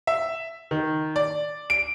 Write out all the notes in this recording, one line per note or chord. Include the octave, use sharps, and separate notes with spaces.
E5
D#3
D5
D7